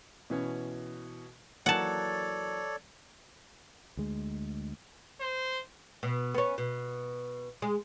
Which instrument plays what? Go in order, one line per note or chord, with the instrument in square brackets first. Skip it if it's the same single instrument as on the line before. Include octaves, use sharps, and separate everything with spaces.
[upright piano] B2 E3 C#4
[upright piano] E3 F#3 A#3 [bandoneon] A4 C#5 D5 [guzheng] F#5 A5
[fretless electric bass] D2 G#3
[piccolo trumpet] C5
[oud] B2
B3 C#4
B2
G#3